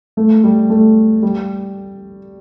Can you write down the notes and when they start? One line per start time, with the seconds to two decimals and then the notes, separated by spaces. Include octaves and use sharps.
0.17 A3
0.44 G3
0.70 A3
1.23 G3